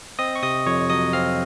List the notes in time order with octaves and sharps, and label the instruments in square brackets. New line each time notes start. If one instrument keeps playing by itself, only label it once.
[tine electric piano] C4 D#5 D#6
C#6
C3 D#5 D#6
F2 C#5 C#6
F#3 D#5 D#6
C4 F5 F6